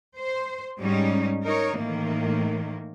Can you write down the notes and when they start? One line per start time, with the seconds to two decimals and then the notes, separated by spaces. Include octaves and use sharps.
0.17 C5
0.79 G#2 G3 C#4 D#4
1.43 D#4 A#4 C#5
1.79 A2 D#3 E3 A#3